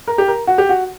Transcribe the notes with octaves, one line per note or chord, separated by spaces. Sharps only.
A#4
G4
A#4
F#4
G4
F#4